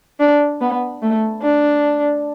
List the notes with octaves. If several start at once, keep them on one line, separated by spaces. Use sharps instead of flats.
D4
B3
A3
D4